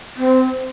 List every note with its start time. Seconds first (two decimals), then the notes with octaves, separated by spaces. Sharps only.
0.16 C4